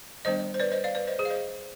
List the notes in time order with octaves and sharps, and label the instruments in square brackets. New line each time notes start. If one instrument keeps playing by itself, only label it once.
[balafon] D#3 G3 B3 D4 C5 D#5
C5
B4 D5
C5 D#5
D5 F5
B4 D5
C5 D#5
G#4 C5
F5
C5 D#5